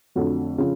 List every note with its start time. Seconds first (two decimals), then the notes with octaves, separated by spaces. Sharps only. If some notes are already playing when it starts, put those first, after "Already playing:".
0.15 F2 D3 F#3 A3
0.58 C#3 F3